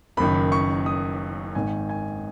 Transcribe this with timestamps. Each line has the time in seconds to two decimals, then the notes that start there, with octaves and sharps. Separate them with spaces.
0.17 F#1 F#2 D#3 B5
0.52 C#6
0.86 D#6
1.55 G#1 G#2 D#3 G#5
1.89 G#5